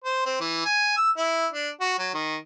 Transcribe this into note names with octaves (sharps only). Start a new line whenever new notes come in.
C5
C4
E3
G#5
E6
E4
D4
F#4
F#3
D#3